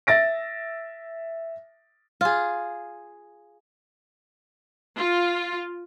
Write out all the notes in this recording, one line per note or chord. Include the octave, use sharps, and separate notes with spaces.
E5 A6 A#6 D7
F4 G#4
F4